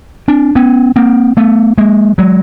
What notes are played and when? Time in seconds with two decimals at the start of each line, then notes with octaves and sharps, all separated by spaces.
0.28 C4 D4
0.55 B3 C#4
0.96 A#3 C4
1.37 A3 B3
1.78 G#3 A#3
2.18 F#3 G#3